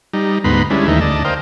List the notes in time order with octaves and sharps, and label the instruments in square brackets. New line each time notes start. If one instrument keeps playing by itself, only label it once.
[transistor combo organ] G3 D#4
D2 G#2 B3 D#4 B5 C6
G3 G#3 C#4 D4 E4
D#2 D#3 E3 A3 D#4 E5
D2 D5 D#5 A5
A#4 C5 D#5 F5 G5